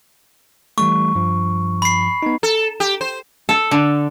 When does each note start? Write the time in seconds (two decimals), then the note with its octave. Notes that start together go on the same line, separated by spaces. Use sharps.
0.78 E3 G3 A3 C#6
1.15 G2 F3
1.82 B5 C7
2.23 B3 D#4
2.43 A4
2.80 G4
3.01 C5
3.49 A4
3.71 D3